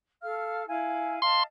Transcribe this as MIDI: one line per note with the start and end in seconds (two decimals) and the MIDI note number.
0.22 0.63 69
0.22 0.63 77
0.22 0.63 89
0.68 1.20 64
0.68 1.20 77
0.68 1.20 80
1.22 1.41 75
1.22 1.41 77
1.22 1.41 81
1.22 1.43 84